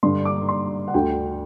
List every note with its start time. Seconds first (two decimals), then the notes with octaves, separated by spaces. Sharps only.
0.03 G2 D3 C6
0.25 D6
0.49 C6
0.88 F#5
0.94 D2 D3 G5